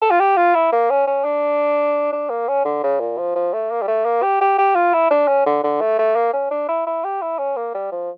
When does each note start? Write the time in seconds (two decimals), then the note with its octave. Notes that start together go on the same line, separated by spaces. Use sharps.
0.02 A4
0.11 F4
0.20 G4
0.37 F4
0.55 E4
0.72 A#3
0.90 C#4
1.07 C#4
1.24 D4
2.12 D4
2.30 A#3
2.48 C#4
2.65 D3
2.83 C#3
3.00 A#2
3.18 F3
3.36 F3
3.54 A3
3.71 A#3
3.82 G3
3.88 A3
4.05 A#3
4.23 G4
4.41 G4
4.58 G4
4.75 F4
4.94 E4
5.11 D4
5.28 C#4
5.46 D3
5.64 D3
5.81 A3
5.99 A3
6.16 A#3
6.33 C#4
6.51 D4
6.69 E4
6.87 E4
7.05 G4
7.22 E4
7.38 C#4
7.56 A#3
7.74 G3
7.92 F3